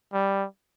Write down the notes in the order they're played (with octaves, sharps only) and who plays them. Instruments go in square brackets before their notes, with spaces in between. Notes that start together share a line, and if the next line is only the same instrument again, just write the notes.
[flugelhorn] G3